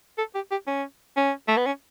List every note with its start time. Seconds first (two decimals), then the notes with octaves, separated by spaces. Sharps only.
0.18 A4
0.35 G4
0.51 G4
0.67 C#4
1.17 C#4
1.48 A3
1.57 B3
1.66 C#4